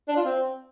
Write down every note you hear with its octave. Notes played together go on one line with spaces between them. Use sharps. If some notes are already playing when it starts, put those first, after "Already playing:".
D4
F4
C4